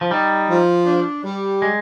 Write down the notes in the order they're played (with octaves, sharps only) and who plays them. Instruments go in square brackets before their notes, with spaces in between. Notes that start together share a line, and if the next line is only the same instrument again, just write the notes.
[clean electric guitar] F3
[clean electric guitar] G3 [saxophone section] D#4
[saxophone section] F3
D4
G3
[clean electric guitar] G#3